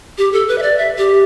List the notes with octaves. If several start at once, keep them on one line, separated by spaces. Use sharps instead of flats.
G4
A4
B4
E5
D5
E5
G4